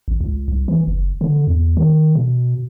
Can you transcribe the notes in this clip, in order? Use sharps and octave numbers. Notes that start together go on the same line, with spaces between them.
A1
C#2
C2
E3
F#1
D3
E2
D#3
B2